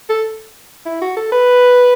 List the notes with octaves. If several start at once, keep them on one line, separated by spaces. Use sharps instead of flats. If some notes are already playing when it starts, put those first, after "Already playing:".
A4
E4
F#4
A4
B4